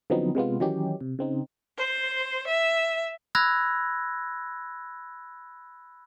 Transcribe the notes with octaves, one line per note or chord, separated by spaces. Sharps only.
D3 F3 F#3 B3 C4 D#4
C3 G#3 B3 F4
D#3 E3 F#3 C#4 D#4 G4
C3
C#3 C4 D#4
C5
E5
B5 E6 F#6 G#6 A#6